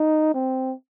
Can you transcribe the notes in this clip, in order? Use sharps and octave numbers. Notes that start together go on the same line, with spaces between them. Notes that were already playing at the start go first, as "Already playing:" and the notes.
Already playing: D#4
C4